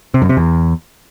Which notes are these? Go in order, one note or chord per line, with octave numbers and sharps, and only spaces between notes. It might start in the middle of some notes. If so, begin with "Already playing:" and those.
C3
F#2
C3
E2